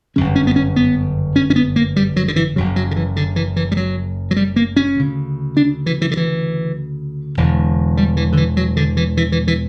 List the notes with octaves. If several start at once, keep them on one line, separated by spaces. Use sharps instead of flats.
G1 F#2 C#3 C#4
C#4
B3
C#4
B3
C#4
C#4
B3
A#3
G3
F#3
D3
E3
F#1 F#2 C#3 F#3
F#3
D3
E3
D3
E3
E3
G3
F#3
F#3
G3
A#3
C#4
D2 C#3
D4
E3
E3
D3
E3
E1 E2 D3
G3
E3
D3
E3
F#3
D3
E3
E3
E3
E3